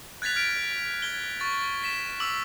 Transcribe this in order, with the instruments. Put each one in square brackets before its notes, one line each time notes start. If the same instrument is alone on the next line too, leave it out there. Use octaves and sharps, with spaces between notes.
[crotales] F#6 G#6 A6 B6 F7
F6 B6 D7
G#6 G7
C#6 A6
B6 E7
D6 E6 F#7